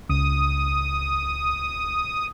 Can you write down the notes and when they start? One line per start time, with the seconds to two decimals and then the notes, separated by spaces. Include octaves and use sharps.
0.09 C#2 D#6